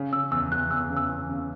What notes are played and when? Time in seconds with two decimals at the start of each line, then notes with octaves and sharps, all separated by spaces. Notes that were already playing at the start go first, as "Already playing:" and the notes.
Already playing: C#3
0.13 C#3 E6
0.31 E2 E6
0.52 E2 F#6
0.71 E2 E6
0.90 C#3
0.97 E6
1.09 E2
1.29 C#3